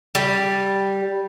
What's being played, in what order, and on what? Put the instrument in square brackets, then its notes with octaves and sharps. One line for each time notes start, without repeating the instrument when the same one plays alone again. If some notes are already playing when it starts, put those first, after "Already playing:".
[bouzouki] G3